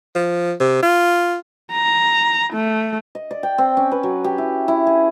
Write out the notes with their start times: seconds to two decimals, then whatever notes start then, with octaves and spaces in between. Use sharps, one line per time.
0.15 F3
0.60 C3
0.83 F4
1.72 A#5
2.53 A3
3.15 D#5
3.31 D5
3.43 G5
3.58 C4
3.77 C#4
3.92 B4
4.03 F#3
4.24 G4
4.38 E4
4.68 E4
4.87 G#4